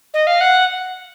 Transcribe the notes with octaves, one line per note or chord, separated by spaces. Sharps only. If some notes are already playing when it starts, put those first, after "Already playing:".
D#5
F5
F#5